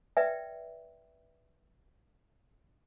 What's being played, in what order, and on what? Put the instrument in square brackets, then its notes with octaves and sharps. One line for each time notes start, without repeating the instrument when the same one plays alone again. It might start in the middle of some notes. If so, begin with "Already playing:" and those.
[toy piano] B4 D5 E5 G5